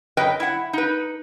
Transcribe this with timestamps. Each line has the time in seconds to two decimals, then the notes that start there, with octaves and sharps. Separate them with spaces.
0.17 F#2 B4 D#5 G5
0.40 E4 F#5
0.73 D#4 B4